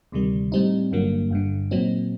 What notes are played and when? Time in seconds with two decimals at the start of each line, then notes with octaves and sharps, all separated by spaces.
0.12 D2 C3 D#3 G3
0.52 A2 G3 C4 D#4
0.91 G1 G2 D3 F#3 A#3
1.31 G1 G2 D3
1.71 A#2 F#3 C4 D#4